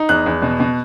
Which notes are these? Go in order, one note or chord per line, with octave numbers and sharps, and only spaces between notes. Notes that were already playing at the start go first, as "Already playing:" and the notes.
Already playing: D#4
E2 F#6
E2
B2
B2